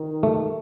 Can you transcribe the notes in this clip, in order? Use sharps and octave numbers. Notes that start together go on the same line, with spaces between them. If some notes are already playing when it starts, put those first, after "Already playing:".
Already playing: D#3
A3